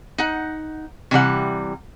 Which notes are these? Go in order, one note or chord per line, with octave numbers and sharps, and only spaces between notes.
D#4 F#5
C3 E3 G3 F#5